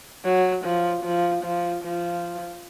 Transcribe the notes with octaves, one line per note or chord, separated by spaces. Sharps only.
F#3
F3
F3
F3
F3